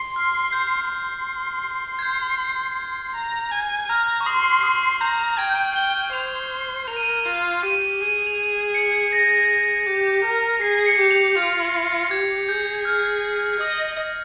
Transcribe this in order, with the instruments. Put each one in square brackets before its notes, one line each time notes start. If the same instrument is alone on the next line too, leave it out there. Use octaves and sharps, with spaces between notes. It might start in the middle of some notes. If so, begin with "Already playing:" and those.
Already playing: [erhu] C6
[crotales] F6
G6
[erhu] C6
[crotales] G#6
G6
[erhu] A#5
G#5
[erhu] A#5 [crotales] F6
[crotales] C#6
[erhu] C6 [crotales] D#6
[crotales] C#6
[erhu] C6 [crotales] D#6
[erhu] A#5 [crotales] G6
[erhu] G5 [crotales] G#6
[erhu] G5 [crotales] G7
[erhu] C5 [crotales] F7
[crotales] G7
[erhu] A#4 [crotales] F7
[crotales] D#7
F7
[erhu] F4
[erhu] G4 [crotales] D#7
[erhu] G#4 [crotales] D#7
[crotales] F7
D#7
C#7
A#6
[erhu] G4
A#4
[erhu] G#4 [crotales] C7
[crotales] C#7
[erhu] G4
[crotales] F7
[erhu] F4 [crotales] F7
[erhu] G4 [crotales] G#6
[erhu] G#4 [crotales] G6
[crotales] F6
[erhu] D#5 [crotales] D#6